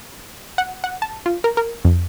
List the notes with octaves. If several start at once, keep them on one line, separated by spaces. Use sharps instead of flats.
F#5
F#5
A5
F4
A#4
A#4
F2